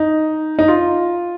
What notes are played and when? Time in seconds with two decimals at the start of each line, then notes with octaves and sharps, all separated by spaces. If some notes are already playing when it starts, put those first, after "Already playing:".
Already playing: D#4
0.59 D#4
0.68 F4